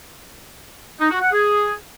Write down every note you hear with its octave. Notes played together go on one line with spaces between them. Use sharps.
D#4
F#4
F#5
G#4